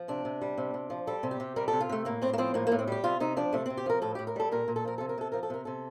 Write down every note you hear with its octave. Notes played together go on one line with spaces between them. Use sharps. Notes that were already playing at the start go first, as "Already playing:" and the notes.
Already playing: F3
C3 D4
C3
G3
C3
C3
F3
G3 A4
C3
G4
C3
G3 A#4
C3 A4
F4
C3 A3
A2 A#3
A2 C4
A#3
F3 C4
A2 A#3
A2 A#3
C4
G3 G4
C3 F4
C3 D#4
F3 D4
C3 A3
C3 C4
G4
F3 A#4
A2 A4
A2 G4
A#4
G3 A4
A#2 A#4
A#2
A4
F3 A#4
C3 A4
A#4
C3 A4
F3 A#4
A4
C3 A#4
C3 A4